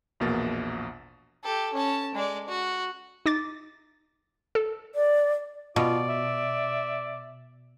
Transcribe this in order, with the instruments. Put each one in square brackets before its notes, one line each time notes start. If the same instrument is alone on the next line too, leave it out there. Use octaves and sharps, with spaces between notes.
[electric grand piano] A#1 E2 B2 A#3 A6
[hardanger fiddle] G4 A4
C#4 A5
G#3 D5
F#4
[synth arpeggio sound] D#4 D6 A6
A4
[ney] D5
[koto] B2 [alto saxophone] F4 [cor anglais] D5
[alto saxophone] E5